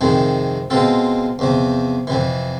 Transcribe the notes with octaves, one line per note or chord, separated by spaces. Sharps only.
F2 C3 D#3 G#3
B2 G#3 C4 F4 A4
E2 C3 F3
F2 C3 E3